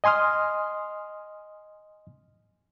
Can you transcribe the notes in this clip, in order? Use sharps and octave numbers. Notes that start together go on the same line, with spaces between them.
D#5 G#5 C6 D#6 F6